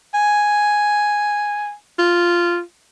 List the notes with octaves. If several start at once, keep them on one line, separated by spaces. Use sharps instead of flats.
G#5
F4